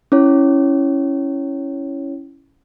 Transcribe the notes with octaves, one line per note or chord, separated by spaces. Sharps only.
C#4 E4 C#5